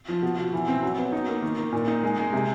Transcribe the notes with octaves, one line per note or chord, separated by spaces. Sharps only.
F3
B2
B2
E3
C4
F#3
B3
D#4
A#3
D#3
D#3
A#2
D#4
G#3
G#3
C3